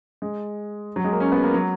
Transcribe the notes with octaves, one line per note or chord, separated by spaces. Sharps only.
G#3
F#3
G#3
A#3
C#4
B3
A#3
F#3